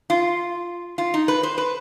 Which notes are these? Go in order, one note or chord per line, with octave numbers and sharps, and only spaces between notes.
F4
F4
D#4
B4
C5
B4